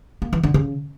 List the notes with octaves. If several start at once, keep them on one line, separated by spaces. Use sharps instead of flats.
A#3
E3
D3
C#3